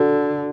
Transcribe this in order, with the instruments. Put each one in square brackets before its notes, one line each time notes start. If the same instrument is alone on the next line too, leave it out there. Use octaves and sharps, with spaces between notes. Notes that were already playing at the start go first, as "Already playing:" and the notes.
Already playing: [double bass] D3 [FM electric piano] F#4 A4